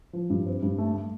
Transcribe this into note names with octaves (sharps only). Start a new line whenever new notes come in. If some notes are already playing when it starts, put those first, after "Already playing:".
F3
G2
C4
G2
A3
A3